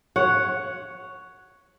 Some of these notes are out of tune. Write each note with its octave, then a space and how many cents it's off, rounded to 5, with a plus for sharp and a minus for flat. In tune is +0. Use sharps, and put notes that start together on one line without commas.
C#5 +5 F#5 +0